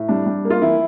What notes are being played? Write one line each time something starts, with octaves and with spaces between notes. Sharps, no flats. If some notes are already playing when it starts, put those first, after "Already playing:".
Already playing: A2
G3 D4
G3
A#3
F4
E3 E4